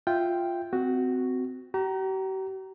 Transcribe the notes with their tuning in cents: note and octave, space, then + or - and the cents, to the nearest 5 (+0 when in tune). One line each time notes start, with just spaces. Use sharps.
F4 +0 E5 +0 G5 +0
C4 -25 F#4 +0
G4 -45 A#5 +5